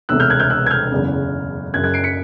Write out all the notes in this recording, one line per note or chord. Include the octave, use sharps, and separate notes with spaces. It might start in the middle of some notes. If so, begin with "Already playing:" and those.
E1 D2 C3 E6 F#6
F6 G6
F#6 G#6
F6 G6
E6 F#6
G#6
F6 G6
F#1 E2 C#3
F#1 F#2 C#3 F#6 G#6
F#6 G#6
C7 D7
B6 C#7